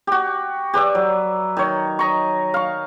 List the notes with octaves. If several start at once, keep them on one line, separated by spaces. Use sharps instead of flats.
F#4 G4
G4 B4 D5 E5
F#3
D#3 C#5
D#5 A#5 C#6
F5 C#6